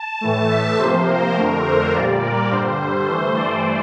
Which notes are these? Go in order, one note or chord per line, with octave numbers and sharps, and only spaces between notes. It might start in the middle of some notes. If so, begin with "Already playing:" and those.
Already playing: A5
A2 E3 A3
E5
C3 F3 A#3 C5
A#4
F2 D3 A3
C5
A#2 G3 A#3 D5
A#4
G2 D3 G3 C5
G2 E3 A3
D5